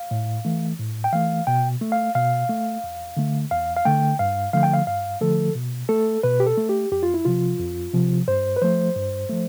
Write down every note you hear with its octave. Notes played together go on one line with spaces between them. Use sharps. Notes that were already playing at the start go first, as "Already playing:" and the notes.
Already playing: F5
A2
E3 A3
A2
G5
E3 A3 F5
B2 G5
A3
F5
B2 F5
A3
E2
D3 A3
E2 F5
F5
D3 A3 G5
G2 F5
D3 F3 A3 F5
G5
F5
G2 F5
D3 F3 A3 A4
B2
A3 A4
B2 B4
G4
A4
A3
G4
F2 G4
F4
E4
C3 F3 F4
F2
C3 F3
G2 C5
B4
F3 A3 C5
G2
F3 A3